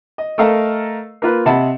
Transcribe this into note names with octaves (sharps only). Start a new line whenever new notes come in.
D#5
A3 A4 A#4 D#5 F5
A#3 F4 B4
C3 D#5 F#5 A5 B5